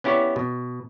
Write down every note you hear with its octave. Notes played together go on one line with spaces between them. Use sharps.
B3 C#4 E4 G4 C#5 D5
B2